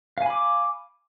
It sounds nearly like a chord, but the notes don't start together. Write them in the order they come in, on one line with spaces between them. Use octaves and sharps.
F5 G#5 B5 D6